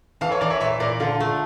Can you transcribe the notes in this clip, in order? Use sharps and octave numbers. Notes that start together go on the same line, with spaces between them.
E3 F5 A5
A4 C#5
E3 A#4 D5
C#5 E5
A#2 C#5 E5
A#2 A#4 D5
D3 F4 A4
A3